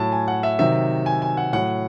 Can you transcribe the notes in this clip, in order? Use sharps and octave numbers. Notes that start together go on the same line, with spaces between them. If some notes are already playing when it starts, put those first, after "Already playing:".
Already playing: A2 F#3 A5
G#5
F#5
E5
C3 D#3 F#3 E5
G#5
G#5
F#5
A2 F#3 F#5